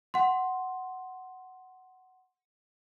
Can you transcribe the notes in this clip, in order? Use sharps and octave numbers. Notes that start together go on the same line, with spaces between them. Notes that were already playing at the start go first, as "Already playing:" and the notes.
F#5 C6